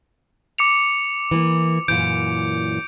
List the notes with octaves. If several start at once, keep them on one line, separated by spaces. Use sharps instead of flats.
D6 C#7 F7
E3 A#3
F#2 A#2 E3 G6 D7